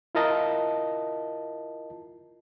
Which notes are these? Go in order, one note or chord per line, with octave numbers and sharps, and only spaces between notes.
E4 F4 A#4 D#5 A5